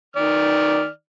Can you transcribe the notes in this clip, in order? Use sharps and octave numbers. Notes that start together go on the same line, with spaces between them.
D#3 D5 F6